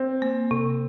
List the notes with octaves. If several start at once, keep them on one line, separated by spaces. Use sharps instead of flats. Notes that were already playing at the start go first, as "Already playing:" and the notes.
Already playing: C4
A#3
C3